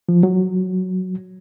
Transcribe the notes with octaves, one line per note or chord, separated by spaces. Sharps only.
F3
F#3